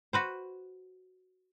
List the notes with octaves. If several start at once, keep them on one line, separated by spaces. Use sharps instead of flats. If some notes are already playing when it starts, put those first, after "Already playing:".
F#4 B4 C5